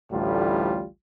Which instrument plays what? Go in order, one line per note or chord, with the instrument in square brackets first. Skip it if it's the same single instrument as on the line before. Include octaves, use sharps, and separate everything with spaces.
[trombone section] A1 D2 A2 G3 F4